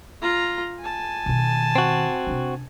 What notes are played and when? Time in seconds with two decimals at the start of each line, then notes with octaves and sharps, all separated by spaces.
0.21 F4 A#5
0.80 G#5 A5
1.26 B2 D#3
1.76 C4 F#4
2.27 C3 D4